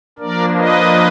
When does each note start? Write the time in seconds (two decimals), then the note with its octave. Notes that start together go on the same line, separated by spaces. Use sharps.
0.19 F3 A#3 D4 A#4 D5
0.57 B4 D#5